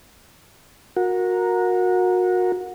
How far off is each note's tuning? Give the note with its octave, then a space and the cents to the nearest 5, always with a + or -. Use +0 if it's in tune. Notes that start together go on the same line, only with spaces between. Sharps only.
F#4 -25 A#4 +0